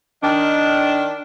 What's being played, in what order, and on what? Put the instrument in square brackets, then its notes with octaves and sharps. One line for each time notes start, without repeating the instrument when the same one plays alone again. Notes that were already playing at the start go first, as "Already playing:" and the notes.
[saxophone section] D#3 D4